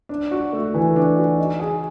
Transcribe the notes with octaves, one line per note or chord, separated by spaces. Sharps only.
D4
F#4
A3
E3
D4
F#4
D#4
G#4